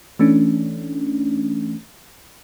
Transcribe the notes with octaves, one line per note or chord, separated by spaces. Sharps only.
E3 A3 C#4 D4